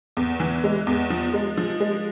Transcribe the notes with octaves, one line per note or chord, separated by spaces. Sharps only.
E2
E3
G#3
E2
F3
G#3
F3
G#3